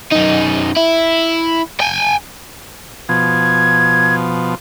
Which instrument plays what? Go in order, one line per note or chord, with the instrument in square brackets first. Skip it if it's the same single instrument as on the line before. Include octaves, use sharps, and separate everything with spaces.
[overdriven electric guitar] F#2 D#4
E4
G5 G#5
[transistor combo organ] B2 F3 [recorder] G#6